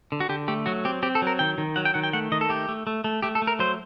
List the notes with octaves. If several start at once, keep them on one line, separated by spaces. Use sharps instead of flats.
D3
F#4
D3 G4
A3 G4
F#3 F#4
C4 G4
C4 G4
A4
F#3 A#4
D#3 G5
D#3
F#3 F#5
G5
D#3 F#5
G5
A3 F#5
D#3 D#5
A4
A3 G4
A3
A3
A3
A3 G4
A4
A3
A#4
F#3 C5